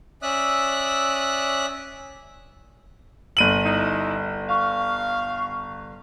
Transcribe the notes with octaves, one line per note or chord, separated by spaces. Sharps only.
C#4 D5 E5 D#6 E6 F#6
G1 D#7 F#7
C#3 D#4 E4
F5 C#6